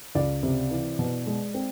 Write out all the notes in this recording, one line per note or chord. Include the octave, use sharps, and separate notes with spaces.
C#2 D5
C3
E3
B2
G#3
C4